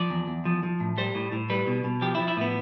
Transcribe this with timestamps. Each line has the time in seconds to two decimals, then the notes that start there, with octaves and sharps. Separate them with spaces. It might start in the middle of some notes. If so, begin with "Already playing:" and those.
Already playing: F3 D5
0.10 E2
0.28 E2
0.45 F3
0.63 F3
0.80 A2
0.98 G3 C5
1.15 A2
1.32 A2
1.50 G3 B4
1.67 B2
1.84 B2
2.01 F3 G4
2.15 E4
2.19 F3
2.28 E4
2.37 A2 B3